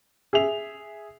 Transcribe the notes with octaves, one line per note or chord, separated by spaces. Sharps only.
G#4 E5 F7